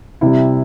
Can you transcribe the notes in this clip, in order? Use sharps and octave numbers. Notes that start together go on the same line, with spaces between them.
C3 G3 E4